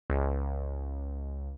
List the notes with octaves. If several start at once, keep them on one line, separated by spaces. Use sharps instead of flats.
C#2